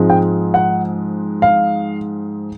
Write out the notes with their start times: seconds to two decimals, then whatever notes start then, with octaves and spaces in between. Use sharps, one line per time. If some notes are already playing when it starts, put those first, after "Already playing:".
Already playing: G#2 F3 G#3 C4
0.10 G5
0.54 F#5
1.42 F5